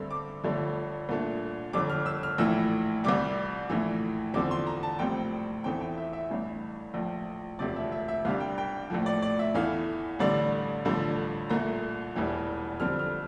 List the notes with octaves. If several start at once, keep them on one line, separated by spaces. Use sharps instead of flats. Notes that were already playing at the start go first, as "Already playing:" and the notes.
Already playing: G2 D3 A3 C4 E6
D6
G1 G2 D3 F3 A3
C2 A#2 A3 D4
G1 F2 D3 D6
F6
E6
F6
A#1 A2 E3 E6
C2 C3 G3 D6
A#1 A2 E3
E2 D3 F3 C4 D6
C6
A#5
A5
A#1 A2 G3 C4 G5
E2 E3 A3 C4 G5
G5
E5
E5
A1 G2 E3
A#1 A2 F3
E1 D2 C3 F3 D5
E5
E5
E5
C2 C3 G3 D4 F5
G5
G5
A#1 A2 F3
D5
D5
E5
E2 E3 A3 F5
A1 G2 D3 G3 D5
A1 G2 D3 F3
C2 A#2 A3 A#5
E1 E2 E3 G3
F2 D3 G3 C4 F6
F6